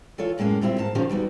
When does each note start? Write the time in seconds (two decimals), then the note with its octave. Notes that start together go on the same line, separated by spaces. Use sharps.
0.18 E3 F4 A4 C#5
0.38 F#2 A2 G#3 A#3 C#4
0.61 A#2 G3 C4 E4 G4
0.78 G#2 A#3 A5
0.95 A#2 D3 D#3 F3 C#4 G4
1.09 E2 G3 D#4 F#4